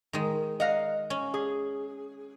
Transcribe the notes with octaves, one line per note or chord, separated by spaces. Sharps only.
D#3 G#3
D#5 F5 F#5 A#5
C#4
G#4